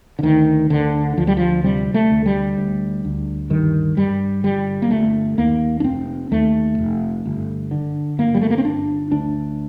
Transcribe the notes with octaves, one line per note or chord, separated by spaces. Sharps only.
D3
D2 D#3
D2 D3
D2 F3
G3
F3
C3 G3
A3
D2
G3
D2
D2
G2 D#3
G2 G3
G1 G3
A#3
G1 A3
D#2 A#3
D4
F1 C4
D#2 A3
F1
G1
D3
G1 A#3
G3
A3
A#3
C4
G1 D4
D2 D4